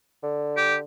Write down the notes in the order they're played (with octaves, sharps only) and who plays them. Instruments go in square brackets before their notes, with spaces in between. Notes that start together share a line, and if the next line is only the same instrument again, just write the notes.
[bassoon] D3
[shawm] G4